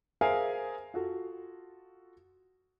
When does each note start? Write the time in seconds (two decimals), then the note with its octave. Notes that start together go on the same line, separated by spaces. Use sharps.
0.21 G#4 A#4 C5 E5 F5 G#5
0.94 F4 F#4 A4